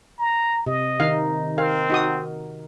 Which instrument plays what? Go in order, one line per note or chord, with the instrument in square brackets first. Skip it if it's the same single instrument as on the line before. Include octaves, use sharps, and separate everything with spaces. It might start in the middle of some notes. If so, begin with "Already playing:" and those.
[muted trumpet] A#5
[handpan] C3 [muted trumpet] D#5
[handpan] D#3 D#4 [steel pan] F5
[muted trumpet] C4 [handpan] A#4 [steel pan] F5
[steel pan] D#4 F#4 D#6